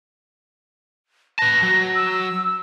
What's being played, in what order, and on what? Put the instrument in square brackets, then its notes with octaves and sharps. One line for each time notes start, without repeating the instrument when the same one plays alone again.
[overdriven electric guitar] B4 A5 [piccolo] A#6
[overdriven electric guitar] F#3
[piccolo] E6